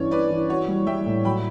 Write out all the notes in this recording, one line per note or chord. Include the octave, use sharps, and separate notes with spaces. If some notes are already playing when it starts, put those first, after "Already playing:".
Already playing: G2 E3 C#4 C#5 D5
C#4 B4 D5
E3
F#4 C#5
G3
G3 E5 G5
A2
F#3 G5 B5